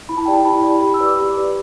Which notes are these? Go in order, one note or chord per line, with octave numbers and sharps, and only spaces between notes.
E4 B5
A5
G4 D5 G5
A5
E4 B5
A5
G4 D5
B5
G4 B5
E6
B4 D5
D6
G4
B4 D5